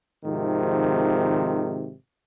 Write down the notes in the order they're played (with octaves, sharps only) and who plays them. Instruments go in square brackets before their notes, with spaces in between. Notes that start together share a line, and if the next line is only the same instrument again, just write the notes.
[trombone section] G#1 G#2 C3 D#3 F3